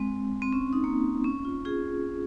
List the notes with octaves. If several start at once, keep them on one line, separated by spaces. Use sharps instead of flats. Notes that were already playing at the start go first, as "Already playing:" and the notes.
Already playing: G#3 C4
C4
C#4
D#4
A#3
C#4
F4
F4 G#4